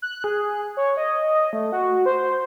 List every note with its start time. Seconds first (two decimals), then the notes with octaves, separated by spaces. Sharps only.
0.02 F#6
0.24 G#4
0.77 C#5
0.97 D#5
1.34 D#5
1.53 A3
1.72 F#4
2.06 C5